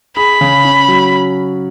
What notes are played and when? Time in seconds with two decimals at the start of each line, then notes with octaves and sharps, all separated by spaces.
0.17 G#4 B5
0.41 C#3
0.65 C#4
0.88 F#3